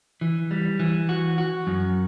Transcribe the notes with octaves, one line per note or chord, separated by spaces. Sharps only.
E3
G3
E3
F#4
F#4
F#2